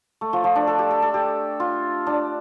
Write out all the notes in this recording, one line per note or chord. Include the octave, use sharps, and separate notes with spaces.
A3
F3
F3
D4
A4
G4
A4
A4
G4
F4
D4